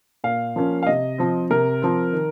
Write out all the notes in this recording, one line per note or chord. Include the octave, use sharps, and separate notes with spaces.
A#2 F5
F3 A#3 C#4
F5
C3 D#5
F3 C4
C3 A#4
F3 C4
D#3